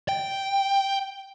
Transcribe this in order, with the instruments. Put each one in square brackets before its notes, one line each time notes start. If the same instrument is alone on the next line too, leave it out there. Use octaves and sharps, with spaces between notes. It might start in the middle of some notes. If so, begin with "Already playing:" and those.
[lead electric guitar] G5